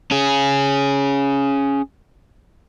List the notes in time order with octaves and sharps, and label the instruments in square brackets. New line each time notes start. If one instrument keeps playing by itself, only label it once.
[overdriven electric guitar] C#4 G#4